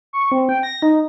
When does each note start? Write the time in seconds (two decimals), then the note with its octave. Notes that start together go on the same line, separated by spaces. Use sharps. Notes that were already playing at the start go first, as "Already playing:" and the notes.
0.13 C#6
0.32 C4
0.49 G5
0.63 A#6
0.82 D#4